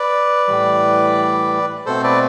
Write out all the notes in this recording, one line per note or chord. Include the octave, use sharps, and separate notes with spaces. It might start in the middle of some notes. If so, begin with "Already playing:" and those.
Already playing: B4 D5
A2 E3 G3
B2 A3 C4 A4 C5
B4 D5